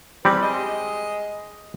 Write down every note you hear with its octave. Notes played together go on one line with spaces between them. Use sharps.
E2 G3 C4 G4 B4
G#3 D#5